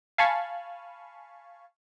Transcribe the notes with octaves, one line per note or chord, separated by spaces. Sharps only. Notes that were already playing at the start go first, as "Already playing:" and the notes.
F5 G#5 A5 B5 C#6